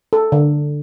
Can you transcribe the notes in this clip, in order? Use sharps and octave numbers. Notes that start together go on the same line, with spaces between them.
A4
D3